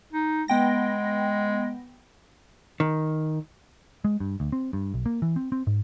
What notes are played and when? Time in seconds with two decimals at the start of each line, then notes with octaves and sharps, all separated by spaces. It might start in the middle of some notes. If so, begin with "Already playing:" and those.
0.13 D#4
0.48 G#3 B3 G5 A#6
2.80 D#3
4.04 G#3
4.20 G2
4.40 D2
4.52 C4
4.73 G2
4.94 B1
5.06 A#3
5.22 E3
5.36 C4
5.52 C4
5.67 G#2